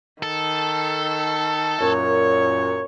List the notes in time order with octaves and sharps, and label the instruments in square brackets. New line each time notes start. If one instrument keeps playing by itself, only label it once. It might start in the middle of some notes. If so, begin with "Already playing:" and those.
[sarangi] D#3 [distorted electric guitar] A4
[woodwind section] F#2 A#2 [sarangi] C#5